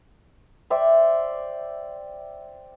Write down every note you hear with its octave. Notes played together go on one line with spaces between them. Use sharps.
C5 D5 E5 G5